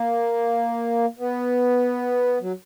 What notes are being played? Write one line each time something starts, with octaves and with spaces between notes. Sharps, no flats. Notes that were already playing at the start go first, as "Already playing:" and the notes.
Already playing: A#3
B3
F#3